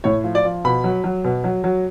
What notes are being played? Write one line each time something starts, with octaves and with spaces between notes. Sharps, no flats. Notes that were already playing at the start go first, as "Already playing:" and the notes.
A2 C#5
F3
D5
F3
B2 B5
F#3
F#3
B2
F#3
F#3